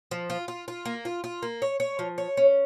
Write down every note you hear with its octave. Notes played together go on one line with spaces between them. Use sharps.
F3
F4
F4
F4
A#3
F4
F4
A#3
C#5
C#5
F3
C#5
C#4